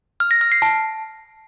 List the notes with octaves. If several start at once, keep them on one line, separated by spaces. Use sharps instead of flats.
F6
A#6
F6
C7
A5